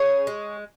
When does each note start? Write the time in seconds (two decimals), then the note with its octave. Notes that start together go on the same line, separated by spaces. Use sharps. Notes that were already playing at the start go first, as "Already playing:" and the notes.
Already playing: C#3 G#4 C#5
0.27 G#3